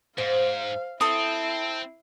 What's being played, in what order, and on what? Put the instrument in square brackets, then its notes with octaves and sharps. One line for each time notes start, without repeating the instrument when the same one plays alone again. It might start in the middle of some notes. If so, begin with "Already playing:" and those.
[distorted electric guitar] G#2 [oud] C5 [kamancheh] F5
[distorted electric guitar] C4 [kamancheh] E4 [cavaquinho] A4 D#6